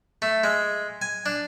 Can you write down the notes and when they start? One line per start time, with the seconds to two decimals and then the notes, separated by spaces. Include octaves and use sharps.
0.22 A3
0.44 G#3
1.02 G#5
1.26 D4